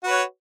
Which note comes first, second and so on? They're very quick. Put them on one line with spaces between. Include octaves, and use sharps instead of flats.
F#4 B4 C#5